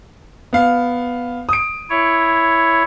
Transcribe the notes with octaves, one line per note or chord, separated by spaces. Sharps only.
B3 F5
D#6 D7
E4 C#5